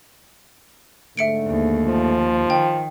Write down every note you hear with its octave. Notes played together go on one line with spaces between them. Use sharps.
G#2 D3 A3 E5 C#7 D7
D#2
F3
D#3 G5